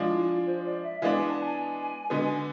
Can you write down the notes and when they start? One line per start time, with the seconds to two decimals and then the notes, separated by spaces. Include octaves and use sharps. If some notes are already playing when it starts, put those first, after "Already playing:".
Already playing: F3 G#3 D4
0.11 E4
0.29 F4
0.47 C5
0.65 D5
0.83 E5
1.01 E3 G#3 B3 D4 F5
1.15 G#5
1.29 A5
1.42 G#5
2.10 D3 G#3 B3